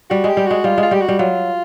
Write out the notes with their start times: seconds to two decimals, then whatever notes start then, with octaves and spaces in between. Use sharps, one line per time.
0.10 G3 F#4
0.24 G#3
0.29 G4
0.37 G3
0.46 G#3 F#4
0.64 G3 F4
0.78 G#3 F4
0.91 G3 G4
1.01 F#4
1.08 G3
1.19 F#3 F4